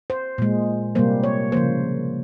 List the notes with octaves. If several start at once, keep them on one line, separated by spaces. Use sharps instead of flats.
C5
A#2 G#3
C3 G3 A#3 C5
C#5
C#3 F3 A#3 C5